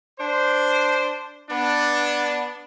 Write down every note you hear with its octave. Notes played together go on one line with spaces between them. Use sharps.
D4 C5
B3 D4